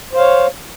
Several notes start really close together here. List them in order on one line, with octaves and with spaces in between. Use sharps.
C5 F5 C#5